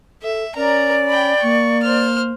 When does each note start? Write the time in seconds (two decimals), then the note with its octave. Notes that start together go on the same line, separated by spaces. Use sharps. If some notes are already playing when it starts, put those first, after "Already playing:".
0.23 A4 E5
0.56 C#4 A#4 D5 A#5
1.08 G5 B5
1.42 A#3 C#6
1.83 C5 F6